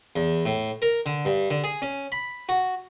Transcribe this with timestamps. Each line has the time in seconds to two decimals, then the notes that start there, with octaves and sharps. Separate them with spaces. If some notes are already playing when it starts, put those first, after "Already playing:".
0.16 E2
0.45 A2
0.82 A#4
1.06 D3
1.25 G2
1.50 D3
1.64 G#4
1.82 C#4
2.12 B5
2.49 F#4